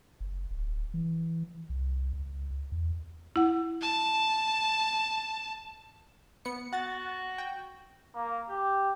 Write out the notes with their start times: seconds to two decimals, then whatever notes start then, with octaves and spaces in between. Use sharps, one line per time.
0.20 F#1
0.51 D1
0.94 E3
1.70 C2
2.13 C#2
2.72 E2
3.36 E4 F#5
3.82 A5
6.45 B3 C#7
6.73 F#4 F#5 A6
7.38 G5
8.15 A#3
8.49 G4